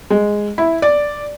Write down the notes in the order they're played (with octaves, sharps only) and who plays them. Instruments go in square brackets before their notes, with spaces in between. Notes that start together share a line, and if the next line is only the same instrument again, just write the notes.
[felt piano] G#3
E4
D5